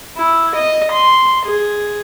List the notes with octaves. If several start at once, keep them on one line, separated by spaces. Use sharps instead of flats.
E4
D#5
C6
G#4